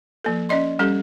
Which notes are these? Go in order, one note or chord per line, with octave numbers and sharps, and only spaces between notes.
F3 A#3 A4
C#4 D5 D#5 C6
G3 C#4 G4 A4